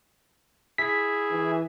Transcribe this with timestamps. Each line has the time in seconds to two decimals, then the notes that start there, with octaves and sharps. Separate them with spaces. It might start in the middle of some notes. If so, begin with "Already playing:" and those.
0.78 E4 G#4 B6
1.30 E3